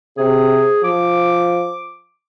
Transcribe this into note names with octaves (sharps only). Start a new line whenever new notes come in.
C3 G#4
F3 D6